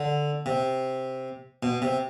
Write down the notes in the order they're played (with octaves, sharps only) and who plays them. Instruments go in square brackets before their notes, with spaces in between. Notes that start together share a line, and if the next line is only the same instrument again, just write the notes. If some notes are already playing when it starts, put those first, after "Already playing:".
Already playing: [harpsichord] D3
C3
B2
C3